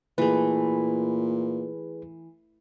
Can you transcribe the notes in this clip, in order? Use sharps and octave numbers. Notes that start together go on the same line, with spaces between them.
A#2 E3 A3 G#4 B4